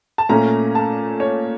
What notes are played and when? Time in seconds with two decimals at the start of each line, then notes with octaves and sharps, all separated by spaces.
0.18 A5
0.29 A#2 A3 C#4 A#5
0.75 A5
1.20 C#5